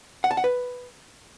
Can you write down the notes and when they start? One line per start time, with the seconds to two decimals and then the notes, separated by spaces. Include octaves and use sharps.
0.24 F#5
0.31 A5
0.37 F#5
0.44 B4